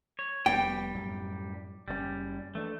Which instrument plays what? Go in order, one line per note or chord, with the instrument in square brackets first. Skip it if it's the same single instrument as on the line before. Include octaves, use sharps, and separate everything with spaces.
[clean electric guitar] C#5
[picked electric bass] F1 B3 [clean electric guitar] G3 [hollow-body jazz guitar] G5
[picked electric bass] F#2 A2 F#3
[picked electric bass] F#1 B2 C#4 [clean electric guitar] G3
[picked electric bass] E3 D4 [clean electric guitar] A3